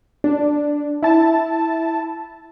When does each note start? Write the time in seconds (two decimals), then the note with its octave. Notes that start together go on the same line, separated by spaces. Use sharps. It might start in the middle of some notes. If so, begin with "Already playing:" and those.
0.24 D4
1.03 E4 A5